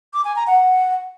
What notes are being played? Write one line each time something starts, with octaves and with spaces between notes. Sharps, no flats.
D6
G#5
A#5
F#5